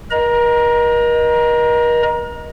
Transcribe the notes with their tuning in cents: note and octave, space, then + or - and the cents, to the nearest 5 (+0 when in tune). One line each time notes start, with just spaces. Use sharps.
A#4 +40 D#5 -5 A#5 +25